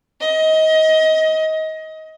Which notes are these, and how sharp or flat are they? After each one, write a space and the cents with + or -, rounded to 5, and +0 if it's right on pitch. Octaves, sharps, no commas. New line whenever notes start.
D#5 +25